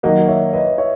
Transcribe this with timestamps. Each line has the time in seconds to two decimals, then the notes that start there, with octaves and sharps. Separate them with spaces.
0.03 D#3 F#3 A#3 D#5 F#5
0.28 C#5 E5
0.53 B4 D#5
0.78 C#5 E5